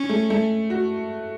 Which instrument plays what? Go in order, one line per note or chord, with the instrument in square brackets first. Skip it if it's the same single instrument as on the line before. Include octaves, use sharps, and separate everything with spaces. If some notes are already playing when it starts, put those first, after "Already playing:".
Already playing: [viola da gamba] C#4
[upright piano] A3
A3
F#4